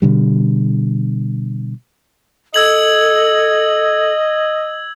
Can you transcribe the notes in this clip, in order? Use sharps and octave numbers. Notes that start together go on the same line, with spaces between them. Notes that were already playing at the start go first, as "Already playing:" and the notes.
B2 D3 G3
A4 D#5 E6 G#6 F#7